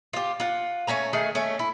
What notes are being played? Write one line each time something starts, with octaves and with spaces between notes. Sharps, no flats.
F4 G4
F4 F#5
A3 C#4 G#5 A#5
D#3 A3 G#4
A3 C#4
E4